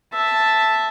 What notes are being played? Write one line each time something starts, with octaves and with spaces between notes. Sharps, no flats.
E5 A5